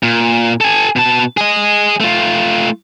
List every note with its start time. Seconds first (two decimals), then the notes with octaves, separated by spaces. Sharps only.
0.03 A#2
0.61 A4 G#5
0.96 B2 A5
1.37 G#4 D#5
2.00 A3 F4